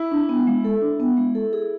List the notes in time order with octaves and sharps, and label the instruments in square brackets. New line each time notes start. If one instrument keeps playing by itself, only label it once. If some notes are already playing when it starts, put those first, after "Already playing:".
Already playing: [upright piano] E4
[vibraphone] D4
B3
G#3
A4
D4
B3
G#3
A4
G#4